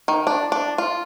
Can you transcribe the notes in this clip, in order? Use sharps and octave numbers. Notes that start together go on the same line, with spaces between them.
D#3
D4
D4
F4